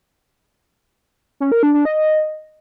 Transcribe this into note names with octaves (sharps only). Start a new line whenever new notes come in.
C#4
A#4
D4
D4
D#5